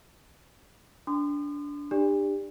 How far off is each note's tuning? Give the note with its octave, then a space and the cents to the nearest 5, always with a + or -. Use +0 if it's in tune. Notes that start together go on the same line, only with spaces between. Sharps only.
D4 -20 C6 -35 D#6 -45
D4 +30 G4 +20 D5 +0